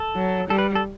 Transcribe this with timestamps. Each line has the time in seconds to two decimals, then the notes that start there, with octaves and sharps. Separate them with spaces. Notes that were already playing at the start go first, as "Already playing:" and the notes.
Already playing: A4
0.16 F#3
0.49 G3 A4
0.58 B4
0.75 A4